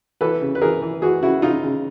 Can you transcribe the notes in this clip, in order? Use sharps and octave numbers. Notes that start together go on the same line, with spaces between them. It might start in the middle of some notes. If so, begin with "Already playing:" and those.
E3 A4 B4
C#3
B4
E3 G#4 A#4
E3
E3 F#4 G#4
C#3 E4 F#4
C#3 D#4 F4
C#3